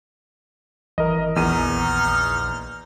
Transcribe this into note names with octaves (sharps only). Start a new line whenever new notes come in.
G#1 E3 A#4 D#5
A#1 E2 D#4 F6 D#7